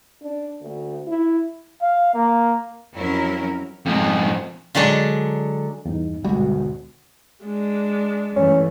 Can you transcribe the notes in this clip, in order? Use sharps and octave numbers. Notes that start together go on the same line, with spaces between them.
D4
D2
E4
F5
A#3
F2 F#3 C#4 E4 A#4
F2 G#2
D3 F#3 G#3 D4
E2 G2 D#4
G#1 D2 B2 G3 G#3 F#4
G#3 D4
G2 E3 A3 C#4